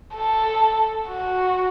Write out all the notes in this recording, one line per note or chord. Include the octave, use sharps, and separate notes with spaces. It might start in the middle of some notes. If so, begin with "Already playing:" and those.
A4
F#4